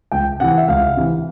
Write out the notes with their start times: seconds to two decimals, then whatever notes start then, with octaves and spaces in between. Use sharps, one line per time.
0.12 C#2 G5
0.40 C3 E3 F#5
0.58 E5
0.68 C#2 F5
0.96 C3 E3